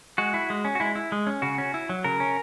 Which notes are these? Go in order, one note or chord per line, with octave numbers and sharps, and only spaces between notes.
G#3 F#4
E4
G#3
C#4
F#4
G#3 E4
E4
G#3
C#4
C#3 F#4
C#4
E4
F#3
C#3 A#4
C#4